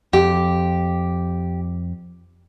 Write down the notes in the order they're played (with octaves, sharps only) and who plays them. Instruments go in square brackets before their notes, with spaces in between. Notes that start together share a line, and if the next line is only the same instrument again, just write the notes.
[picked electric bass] F2 [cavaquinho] G4